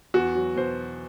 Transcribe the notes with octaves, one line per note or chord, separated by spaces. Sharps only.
E2 F#4
F#3
B2 C5